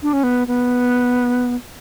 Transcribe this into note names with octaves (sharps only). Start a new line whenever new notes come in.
D4
C#4
B3
B3